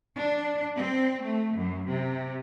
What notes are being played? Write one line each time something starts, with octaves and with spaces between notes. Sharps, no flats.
D4
C4
A3
F#2
C3